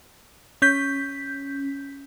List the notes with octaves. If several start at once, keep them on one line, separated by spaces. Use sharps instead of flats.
C#4 G6 B6